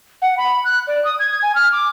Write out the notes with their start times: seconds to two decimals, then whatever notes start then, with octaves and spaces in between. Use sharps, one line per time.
0.22 F#5
0.37 B5
0.65 F#6
0.87 D5
1.04 D#6
1.19 G#6
1.42 G#5
1.55 F6
1.72 D6